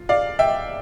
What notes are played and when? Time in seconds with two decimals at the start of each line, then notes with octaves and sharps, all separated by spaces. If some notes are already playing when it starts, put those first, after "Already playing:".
Already playing: F4
0.09 D5 F5
0.39 E5 G5